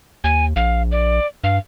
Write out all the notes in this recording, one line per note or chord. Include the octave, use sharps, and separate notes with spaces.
D#2 G#5
A#1 F5
D5
G2 F5